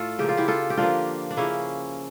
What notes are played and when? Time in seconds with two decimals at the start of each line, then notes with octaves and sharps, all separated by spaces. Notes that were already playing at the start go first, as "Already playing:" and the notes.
Already playing: A2 A3 F4 A4
0.19 C#3 F3 A#3 G4
0.29 F4
0.37 E4 G4
0.48 F4 A4
0.70 G4
0.77 D3 F3 A#3 D4 F4
1.31 D4
1.37 C#3 F3 A#3 C#4 E4